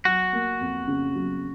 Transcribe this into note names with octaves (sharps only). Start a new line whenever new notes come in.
F#3 F#4
A#3
F2
C#3
F#3